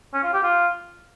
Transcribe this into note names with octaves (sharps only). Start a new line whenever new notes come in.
C#4
F4
G4
F4